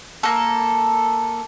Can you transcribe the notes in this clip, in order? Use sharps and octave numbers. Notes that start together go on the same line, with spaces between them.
A#3 A4